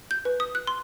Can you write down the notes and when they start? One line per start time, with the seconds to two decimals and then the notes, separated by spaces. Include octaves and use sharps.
0.11 G6
0.25 B4
0.40 D#6
0.55 F#6
0.67 C6